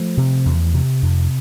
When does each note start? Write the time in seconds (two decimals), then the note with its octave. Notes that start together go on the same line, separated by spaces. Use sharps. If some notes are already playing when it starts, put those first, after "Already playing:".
Already playing: F3 A3
0.17 C3
0.45 E2
0.74 C3
1.02 F2